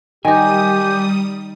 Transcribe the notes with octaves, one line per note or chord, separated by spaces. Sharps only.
D#3 G3 D#4 G4 G#5 D#6